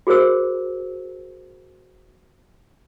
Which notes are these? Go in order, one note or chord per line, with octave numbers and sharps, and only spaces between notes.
F#4 G#4 A#4 C5 E6